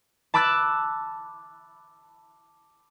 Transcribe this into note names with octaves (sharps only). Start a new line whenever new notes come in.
A5 B5 D6 E6 F#6 A6